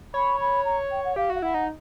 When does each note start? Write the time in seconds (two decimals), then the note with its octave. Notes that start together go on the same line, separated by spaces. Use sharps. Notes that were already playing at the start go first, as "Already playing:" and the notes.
0.14 C#5 B5
0.40 B5
0.65 A#5
0.91 G5
1.04 F#5
1.16 G4 F5
1.30 F#4
1.35 F5
1.42 E4 F#5
1.54 D#4